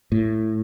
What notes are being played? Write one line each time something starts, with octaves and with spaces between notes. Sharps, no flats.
A2